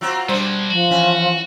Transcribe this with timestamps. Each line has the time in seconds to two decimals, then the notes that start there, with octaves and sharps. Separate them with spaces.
0.01 F#3 C4 F4
0.29 B2 F#3 G3 D4 C5
0.70 F3 F#4
0.91 E3 C#4 G#5